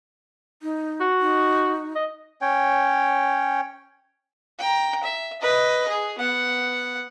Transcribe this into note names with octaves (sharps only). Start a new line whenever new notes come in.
D#4
F#4
D#4
D#5
C#4 C#5 G5
G5 A#5
E5
B4 D#5
G#4
B3 F#5